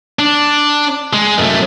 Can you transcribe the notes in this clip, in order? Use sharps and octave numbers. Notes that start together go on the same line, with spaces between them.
D4
G#3
F#2 A3